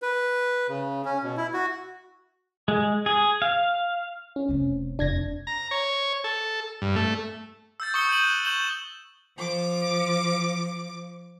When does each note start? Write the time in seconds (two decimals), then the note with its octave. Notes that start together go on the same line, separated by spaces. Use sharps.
0.02 B4
0.69 C#3
1.05 C#4
1.23 B2
1.37 E4
1.54 F#4
2.68 G#3
3.06 G#4
3.42 F5
4.36 C#4
4.49 F1 C3
4.99 F1 D4 G#6 A#6
5.47 A#5
5.71 C#5
6.24 A4
6.82 G2
6.96 A3
7.80 E6 G6 A6
7.94 C#6 D#6 E6 C#7 G7
8.09 G6 D#7 F#7
8.23 F#6
8.44 C#6 G6 E7 F#7 G7
9.38 F3 D6